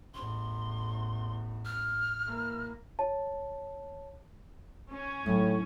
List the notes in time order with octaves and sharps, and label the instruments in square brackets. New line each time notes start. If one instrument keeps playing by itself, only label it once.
[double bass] A1 E2 [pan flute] C6
[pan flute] F6
[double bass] E3 A#3
[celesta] C#5 A5
[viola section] C#4
[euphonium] A2 [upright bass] F#3 D#4